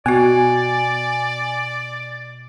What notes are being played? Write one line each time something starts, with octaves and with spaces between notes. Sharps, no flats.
B2 B3 F#4 D5 G#5